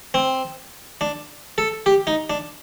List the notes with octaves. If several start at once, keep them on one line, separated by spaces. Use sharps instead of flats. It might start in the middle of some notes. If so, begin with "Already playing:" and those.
C4
D4
A4
G4
D#4
D4